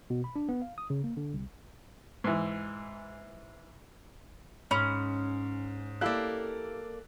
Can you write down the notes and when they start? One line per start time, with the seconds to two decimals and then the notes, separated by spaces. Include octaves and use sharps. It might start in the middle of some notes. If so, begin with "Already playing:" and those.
0.10 B2
0.24 B5
0.36 D4
0.49 B3
0.62 F5
0.78 D#6
0.90 C#3
1.04 A#3
1.17 D3
1.34 C2
2.24 G#2 E3
4.71 G#2 C#4 B5
6.01 A#3 E4 G4 A4 D5 F5 E6 F#6